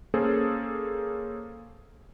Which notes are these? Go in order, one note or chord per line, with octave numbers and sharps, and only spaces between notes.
A#3 C#4 G#4 A4 C5